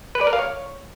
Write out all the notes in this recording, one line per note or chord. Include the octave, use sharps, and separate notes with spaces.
B4
D5
A#4
F5
C#5